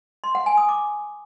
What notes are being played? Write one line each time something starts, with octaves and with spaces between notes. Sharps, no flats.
C6
F#5
G#5
D#6
D6